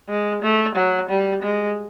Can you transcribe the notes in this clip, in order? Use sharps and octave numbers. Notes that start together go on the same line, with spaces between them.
G#3
A3
F#3
G3
G#3